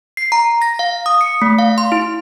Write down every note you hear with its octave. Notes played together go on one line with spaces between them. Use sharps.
C7
A#5
A#6
F5
D#6
C#7
A3
F5
C6
E4